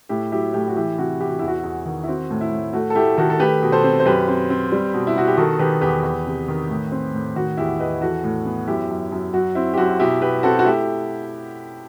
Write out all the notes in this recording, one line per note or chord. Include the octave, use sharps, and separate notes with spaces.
A2 E4 G4
F#3 E4 G4
A2 E4 G4
F#4
E3 E4 G4
C3 F#4
E3 G4
F#4
E2 E4
F#4
E2
D#3
E4
C4 F#4
A2
E4
A2
A3 F#4
A4
A3 E4 G4
D#3 F#4 A4
A4
A3 G4 B4
B2
A4 C5
C4
C5
F#2 G4 B4
C4
C4
G3
B2
E4
B2 F#4
G4
D#3 F#4 A4
D#3 G4 B4
E2 G4 B4
E2
C3
D#3
A2
C4
A2
D#3 F#4
E2 E4 G4
E2 B4 D#5
E3 F#4 A4
A2
B3
F#2 E4 G4
F#2
F#2
F#3 F#4
C4 E4
G4
F#2 F#4
B2 E4 G4
B2 G4 B4
C4 F#4 A4
F#4
A3 E4 G4